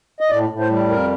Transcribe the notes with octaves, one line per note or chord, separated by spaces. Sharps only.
D#5
A2 D5
A2
C5
G3
F2 A#4